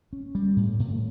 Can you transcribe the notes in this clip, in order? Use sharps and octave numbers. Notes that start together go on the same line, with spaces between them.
C#4
G3
A2
A2